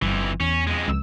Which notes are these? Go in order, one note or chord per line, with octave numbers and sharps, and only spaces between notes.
G1 F2 E3
E2 C#4
F2 G#3
C#2 E6